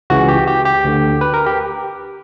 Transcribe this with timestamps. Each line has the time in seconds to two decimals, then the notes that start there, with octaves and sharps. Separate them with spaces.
0.10 C#2 C#3 E3 F#4
0.28 G4
0.47 G4
0.65 G4
0.85 D2 D3
1.21 B4
1.34 A#4
1.46 G4